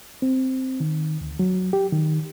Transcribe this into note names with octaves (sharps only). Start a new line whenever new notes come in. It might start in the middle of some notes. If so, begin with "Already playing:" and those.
C4
D#3
D2
F#3
G4
D#3